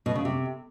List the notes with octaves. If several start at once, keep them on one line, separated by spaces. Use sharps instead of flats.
B2
C#3
C3